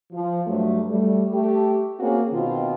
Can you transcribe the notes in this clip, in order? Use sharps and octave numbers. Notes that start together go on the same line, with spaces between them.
F3
G2 F#3 A3
G3 A3
A3 G4
A#3 C4 C#4 F#4 G#4
B2 D#3 C4 F4